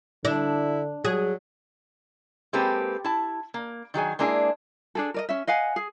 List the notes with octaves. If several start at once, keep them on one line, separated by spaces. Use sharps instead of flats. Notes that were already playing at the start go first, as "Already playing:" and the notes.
D3 D4 E4
F#3 G#4
G#3 A#3 C4 G4 A4 B4
E4 A5
A#3
D#3 F#3 G#4 G#5
G#3 A#3 D4 E4 F#4 G#4
D4 G#4 A4
A#4 D5 D#5
C#4 E5
D#5 F5 F#5 G#5
G#4